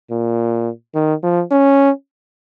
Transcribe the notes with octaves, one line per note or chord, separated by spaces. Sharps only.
A#2
D#3
F3
C#4